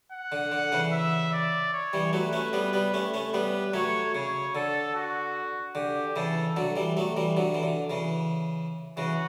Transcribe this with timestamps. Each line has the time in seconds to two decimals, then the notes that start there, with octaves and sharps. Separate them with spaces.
0.12 F#5
0.32 D3
0.52 D3
0.72 C#3 E3
0.92 E5
1.33 D5
1.73 C#5
1.93 E3 G3
2.13 F#3 A3 B4
2.33 A3 C#4
2.53 G3 B3
2.73 G3 B3
2.94 A3 C#4
3.14 A3 C#4
3.34 G3 B3 B4
3.74 F#3 A3 C#5
4.14 C#3 C#5
4.55 D3 A4
4.95 F#4
5.75 D3 G4
6.16 C#3 E3 A4
6.57 D3 F#3
6.76 E3 G3
6.97 F#3 A3
7.17 E3 G3
7.37 D3 F#3
7.54 E3
7.63 D3
7.90 C#3 E3
8.97 C#3 E3 F#4